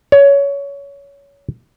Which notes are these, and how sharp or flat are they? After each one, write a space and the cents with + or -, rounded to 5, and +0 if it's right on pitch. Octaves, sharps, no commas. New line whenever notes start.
C#5 +20